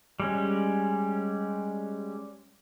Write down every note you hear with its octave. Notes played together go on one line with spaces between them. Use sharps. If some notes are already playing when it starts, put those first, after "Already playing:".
G3 G#3 C#4